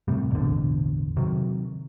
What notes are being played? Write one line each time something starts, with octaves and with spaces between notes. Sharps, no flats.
A2 C3 G3
A1 E2 B2 D3
C3 D#3 F#3